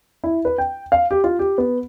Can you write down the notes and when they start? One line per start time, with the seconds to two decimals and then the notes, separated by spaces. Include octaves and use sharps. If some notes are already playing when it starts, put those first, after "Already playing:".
0.24 E4
0.45 B4
0.58 G5
0.92 F5
1.11 G4
1.24 F4
1.39 G4
1.58 B3